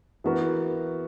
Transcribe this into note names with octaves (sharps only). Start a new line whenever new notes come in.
E3 B3 F#4 A#4